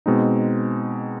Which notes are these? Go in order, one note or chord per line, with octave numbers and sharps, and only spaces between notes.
B2 G#3 C4 D#4